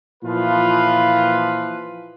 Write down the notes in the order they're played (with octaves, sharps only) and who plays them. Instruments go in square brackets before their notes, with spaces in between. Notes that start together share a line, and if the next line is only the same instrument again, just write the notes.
[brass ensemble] A#2 E3 F3 F4 B4